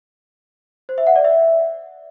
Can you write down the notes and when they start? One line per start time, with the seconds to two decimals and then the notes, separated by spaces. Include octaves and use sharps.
0.89 C5
0.98 E5
1.07 F#5
1.16 D5
1.24 E5